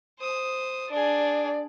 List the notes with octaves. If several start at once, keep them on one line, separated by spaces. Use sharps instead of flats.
C5 D#6
D4 G#4 D5